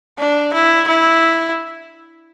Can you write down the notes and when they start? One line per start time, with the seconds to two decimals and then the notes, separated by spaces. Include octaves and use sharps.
0.18 D4
0.54 E4
0.88 E4